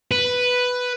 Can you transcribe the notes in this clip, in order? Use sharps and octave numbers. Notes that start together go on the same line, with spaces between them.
B4